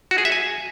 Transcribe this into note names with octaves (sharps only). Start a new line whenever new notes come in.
F#4
G#4
E5
G#5